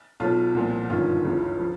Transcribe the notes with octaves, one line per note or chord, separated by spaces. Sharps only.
B1 B2 F4
C2 A#2 F3
G1 F#2 D#3 F4
C#2 C#3 E3
F3